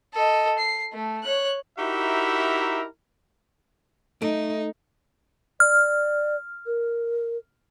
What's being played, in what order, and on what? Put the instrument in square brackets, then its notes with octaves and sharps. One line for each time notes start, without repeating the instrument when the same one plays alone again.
[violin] A4 D#5
C7
A3
C#5 F#6
[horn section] D#4 E4 F#4 G4 A#4 E5
[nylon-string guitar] A3 [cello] D#4
[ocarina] D5 [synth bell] F6
[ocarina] A#4